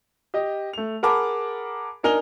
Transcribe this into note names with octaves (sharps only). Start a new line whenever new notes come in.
G4 D#5
A3 F7
G#4 A#4 F#5 A5 B5 D6
D4 D#4 A#4 G#5 F7 G7